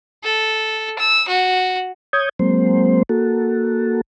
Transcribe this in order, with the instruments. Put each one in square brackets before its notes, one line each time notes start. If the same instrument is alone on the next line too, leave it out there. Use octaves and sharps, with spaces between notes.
[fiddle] A4
E6
F#4
[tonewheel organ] C#5 D#6 G6 G#6
F#3 G#3 A#3 C4 C5
A#3 F#4 A4